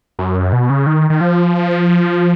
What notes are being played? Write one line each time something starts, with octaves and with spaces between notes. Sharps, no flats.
F#2
B2
C#3
D#3
D#3
F3